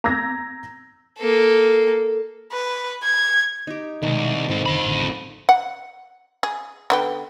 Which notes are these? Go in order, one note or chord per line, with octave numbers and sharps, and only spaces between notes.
A#5 E6 G6 G#6 A#6
A#3 A4
B4
G#6
D#4 G4
C2 B2 D#3 G#3
B1 G#2 C4 A4
F1 F2 D3 B5
A1 A2 D3
F#5
G#4
D3 B3 G4